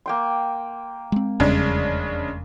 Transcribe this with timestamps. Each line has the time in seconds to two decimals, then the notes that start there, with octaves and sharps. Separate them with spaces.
0.06 A#3 G5 C6
1.12 G#3 C4
1.40 F1 E2 C#3 G3 G#3 D4